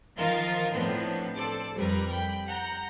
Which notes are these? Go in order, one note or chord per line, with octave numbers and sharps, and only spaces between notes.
D#3 F3 D#4 F4 A#4
A2 F3 B3 C4 D4
A4 C5 D5 D6
F2 G3 A#4 B4
G5 B5
F#5 A#5 G6